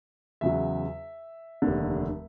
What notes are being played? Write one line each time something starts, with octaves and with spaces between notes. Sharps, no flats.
E2 C#3 F#3 E5
F1 D#2 D3